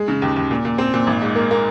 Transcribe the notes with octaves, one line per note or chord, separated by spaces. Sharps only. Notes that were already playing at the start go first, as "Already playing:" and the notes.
Already playing: G#3
C#3
D#2
D#2
A#2
A#2
C4
A#2
G#1
G#2
A#3
A#3